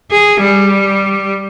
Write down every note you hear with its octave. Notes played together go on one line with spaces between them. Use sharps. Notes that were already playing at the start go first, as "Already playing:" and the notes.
G#4
G3